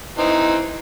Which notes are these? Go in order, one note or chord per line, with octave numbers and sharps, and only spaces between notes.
E3 C4 D#4